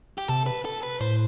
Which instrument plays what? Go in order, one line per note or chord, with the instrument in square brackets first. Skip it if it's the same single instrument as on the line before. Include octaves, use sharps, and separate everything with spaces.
[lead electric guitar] G4
[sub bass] C3 [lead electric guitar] A4
[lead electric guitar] B4
A4
B4
[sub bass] A2 [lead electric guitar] C5